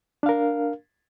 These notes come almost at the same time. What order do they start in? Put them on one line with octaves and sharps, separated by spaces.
D4 F5 A#4